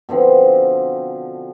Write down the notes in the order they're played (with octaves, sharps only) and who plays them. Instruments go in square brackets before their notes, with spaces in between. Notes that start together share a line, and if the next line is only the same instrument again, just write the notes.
[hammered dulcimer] B2 D3 F3 C4